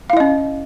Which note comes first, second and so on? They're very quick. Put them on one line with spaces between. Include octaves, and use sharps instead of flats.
F5 E4 D#5 C#4